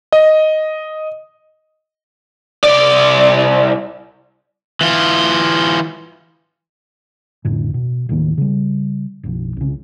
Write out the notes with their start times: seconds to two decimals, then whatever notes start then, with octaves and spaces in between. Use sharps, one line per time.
0.12 D#5
2.64 C2 D5
4.81 E3 F4
7.45 B1 F2 A2 D3
7.74 B2
8.09 A1 D#2 D#3 A#3
8.38 C#3 G3
9.23 F#1 B1 F3
9.57 C2 C#3